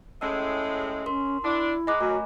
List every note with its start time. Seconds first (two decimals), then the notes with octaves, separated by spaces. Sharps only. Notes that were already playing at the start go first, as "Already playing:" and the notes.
0.21 A2 G#3 C#4 D#5 E6
1.06 C#4 A#4 C6
1.43 D4 E4
1.87 G#3 D#5 A#5 B5 D6 F#6
2.00 F#2 A3 F#4 A#4 G#5